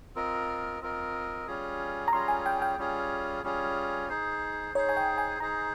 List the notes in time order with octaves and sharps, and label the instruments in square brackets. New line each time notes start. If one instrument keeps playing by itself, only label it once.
[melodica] C4 F4 A#4 D#5
C4 F4 A#4 D#5
G3 C#4 F4 G#4
[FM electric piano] A#5
[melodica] G3 C#4 F4 G#4 [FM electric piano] C6
[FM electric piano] G#5
G5
G5
[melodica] G3 C#4 F4 G#4
G3 C#4 F4 G#4
D#4 G#4 C5
[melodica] D#4 G#4 C5 [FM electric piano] C#5
[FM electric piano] G#5
G5
G#5
[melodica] D#4 G#4 C5 [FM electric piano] A#5